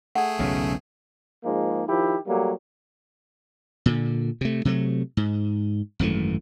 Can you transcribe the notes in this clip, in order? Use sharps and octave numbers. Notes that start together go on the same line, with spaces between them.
A3 G#4 F#5
B1 E2 G#2 C#3 C#4
G#2 F3 G#3 A#3
D#3 F3 E4 G4
F#3 G3 A3 A#3
A#2 D3
C3 A3
C3 F#3 G#3 A3
G#2
G#1 F#2 E3 A3